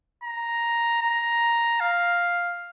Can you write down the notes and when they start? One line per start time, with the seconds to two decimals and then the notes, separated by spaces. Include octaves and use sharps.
0.24 A#5
1.02 A#5
1.80 F5